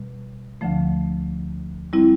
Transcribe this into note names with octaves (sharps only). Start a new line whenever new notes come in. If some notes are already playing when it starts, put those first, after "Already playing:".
Already playing: B2 G3
D2 D3 F3 A3
G3 C4 E4